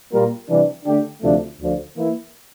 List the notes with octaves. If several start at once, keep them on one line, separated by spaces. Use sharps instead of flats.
A#2 G3 A#3 F4 A#4
C3 E3 G3 D4
D3 A3 D4 G4
D2 C3 F3 A3 D4
D2 D3 F3
E3 A#3 E4